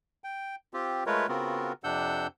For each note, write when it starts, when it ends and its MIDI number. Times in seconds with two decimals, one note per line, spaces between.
0.24 0.56 79
0.74 1.04 60
0.74 1.04 65
0.74 1.04 67
1.06 1.27 56
1.06 1.27 57
1.06 1.27 65
1.06 1.27 70
1.06 1.27 71
1.06 1.27 73
1.29 1.73 49
1.29 1.73 59
1.29 1.73 60
1.29 1.73 65
1.29 1.73 66
1.29 1.73 70
1.84 2.27 41
1.84 2.27 48
1.84 2.27 62
1.84 2.27 78
1.84 2.27 88
1.84 2.27 91